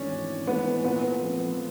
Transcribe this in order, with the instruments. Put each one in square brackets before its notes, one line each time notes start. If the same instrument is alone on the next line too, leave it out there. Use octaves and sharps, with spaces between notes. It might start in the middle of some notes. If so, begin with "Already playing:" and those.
Already playing: [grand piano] G#1 G#2 E3 A3 [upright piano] C#4 D4
[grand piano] G#1
[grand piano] G#2 E3 A3 [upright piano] B3
[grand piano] A#2 [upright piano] B3
[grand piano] F3 A3 C4